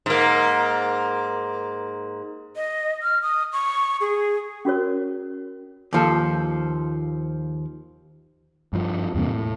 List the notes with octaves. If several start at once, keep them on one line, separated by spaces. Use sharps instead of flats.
G#2 A#3
D#5
F6
D#6
C#6
G#4
C#4 F#4 A#4 C#5
D#2 F3 A4
G2 F3
E2 G2 C3 A#3
A2